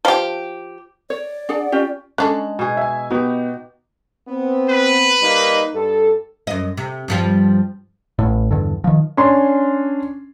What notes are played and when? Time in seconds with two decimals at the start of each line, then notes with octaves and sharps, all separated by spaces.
0.05 F3 G4
1.10 C#5 D5
1.49 D4 G#4 F#5
1.72 C#4 F4 G4
2.18 G#3 C#4 D4 A4 F#6
2.59 B2 G#4
2.77 E5 G#5
3.11 B3 D#4 F#4 G4
4.29 B3 C4
4.69 B4
5.22 G3 A#3 D#4
5.73 G2 A4
6.47 F#2 D#5
6.77 C3
7.08 G2 F3 G3
8.19 A1 A2
8.51 E2 G2 D3
8.84 D#3 F3
9.17 C#4 D4 C6